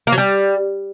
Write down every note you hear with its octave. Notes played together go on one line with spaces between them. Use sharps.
A#3
F#3
G3